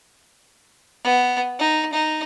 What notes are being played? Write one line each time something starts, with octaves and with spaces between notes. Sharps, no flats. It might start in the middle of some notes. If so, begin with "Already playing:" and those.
B3
D#4
D#4